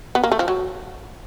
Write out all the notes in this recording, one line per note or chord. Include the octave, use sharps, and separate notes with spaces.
B3
A#3
A3
F3
F#3